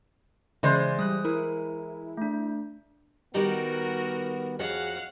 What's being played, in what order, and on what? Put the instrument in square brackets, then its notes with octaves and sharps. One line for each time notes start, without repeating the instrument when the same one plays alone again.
[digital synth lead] C#3 [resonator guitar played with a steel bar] E3 G#3 C5 [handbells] D5
[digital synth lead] G3 [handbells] D#6 F#6
[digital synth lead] E4 [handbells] A#4
[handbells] A3 D4
[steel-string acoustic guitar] D#3 G3 [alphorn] B3 [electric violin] F#4 A#4
[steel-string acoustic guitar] F2 F#4 C#5 [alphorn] G#4 [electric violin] F5 F#5